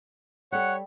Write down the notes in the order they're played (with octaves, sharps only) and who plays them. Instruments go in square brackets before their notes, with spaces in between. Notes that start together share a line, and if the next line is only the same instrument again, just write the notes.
[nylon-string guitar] G3 A4 [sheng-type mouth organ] C#5 [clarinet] F#5